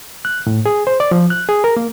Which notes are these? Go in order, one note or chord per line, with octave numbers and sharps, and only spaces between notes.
F#6
A2
G#4
C5
D5
F3
F#6
G#4
A#4
A#3